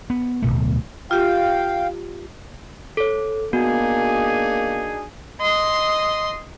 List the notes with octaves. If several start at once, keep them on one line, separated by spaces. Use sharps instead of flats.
B3
D1 G#1 B2 A3
F4 G4 F5 G5
A4 C#5
A#3 B3 D4 D#4 F#4 G#4
D#5 C6